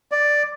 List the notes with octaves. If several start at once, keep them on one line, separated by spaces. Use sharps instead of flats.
D5